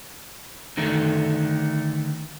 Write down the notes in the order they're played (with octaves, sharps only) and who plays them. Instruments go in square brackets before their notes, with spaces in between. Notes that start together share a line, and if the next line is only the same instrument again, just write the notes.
[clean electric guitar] D3 D#3 A3